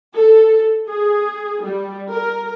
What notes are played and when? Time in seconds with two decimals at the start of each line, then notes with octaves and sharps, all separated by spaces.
0.15 A4
0.88 G#4
1.63 G3
2.13 A#4